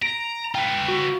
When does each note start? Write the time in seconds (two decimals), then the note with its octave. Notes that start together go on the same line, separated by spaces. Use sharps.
0.02 A#5 D7
0.55 F4 B4 G5
0.88 F#4